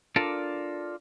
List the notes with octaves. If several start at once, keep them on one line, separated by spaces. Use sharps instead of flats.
D4 F4 A4 A#4 D5